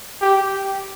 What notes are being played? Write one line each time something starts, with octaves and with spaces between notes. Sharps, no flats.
G4